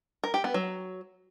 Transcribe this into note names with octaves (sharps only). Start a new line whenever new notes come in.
A#4
G4
B3
F#3